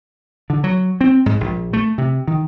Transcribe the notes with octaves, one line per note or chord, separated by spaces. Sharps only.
D3
F#3
C4
G#2
A#1
A3
C3
D#3